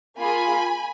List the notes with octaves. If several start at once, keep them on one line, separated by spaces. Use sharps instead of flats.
A#3 F4 G#4 G#5 B5